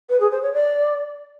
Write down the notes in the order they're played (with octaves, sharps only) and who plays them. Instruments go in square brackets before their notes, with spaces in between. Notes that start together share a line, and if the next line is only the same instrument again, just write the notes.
[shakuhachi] B4
G#4
C5
C#5
D5